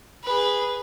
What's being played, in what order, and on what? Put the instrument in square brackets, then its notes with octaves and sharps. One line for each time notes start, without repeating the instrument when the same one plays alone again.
[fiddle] G#4 B4